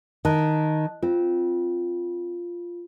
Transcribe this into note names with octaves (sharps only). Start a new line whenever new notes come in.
D#3 D#5 A5 F#6
C4 F4